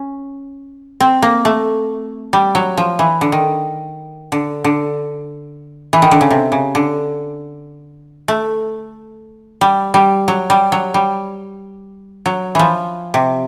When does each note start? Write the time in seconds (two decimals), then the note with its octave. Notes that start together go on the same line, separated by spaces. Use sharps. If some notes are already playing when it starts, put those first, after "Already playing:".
Already playing: C#4
1.00 C4
1.22 A#3
1.45 A3
2.33 G3
2.55 F#3
2.77 F3
2.99 E3
3.21 D3
3.32 D#3
4.32 D3
4.64 D3
5.93 E3
6.02 D#3
6.11 D3
6.21 C#3
6.31 C3
6.52 C#3
6.75 D3
8.28 A3
9.61 G3
9.94 G3
10.28 F#3
10.50 G3
10.72 F#3
10.94 G3
12.26 F#3
12.55 E3 F3
13.14 C3